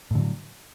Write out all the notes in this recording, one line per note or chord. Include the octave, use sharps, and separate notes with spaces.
A2 D3 F#3